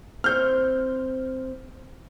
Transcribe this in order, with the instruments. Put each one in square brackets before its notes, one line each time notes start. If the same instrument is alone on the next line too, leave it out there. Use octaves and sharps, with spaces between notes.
[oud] C4 E4 C#5 [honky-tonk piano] F6 G6